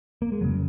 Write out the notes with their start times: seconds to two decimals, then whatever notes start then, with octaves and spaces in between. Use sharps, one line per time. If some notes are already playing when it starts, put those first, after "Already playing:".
0.22 A#3
0.32 G#3
0.41 F2 C#3 F#3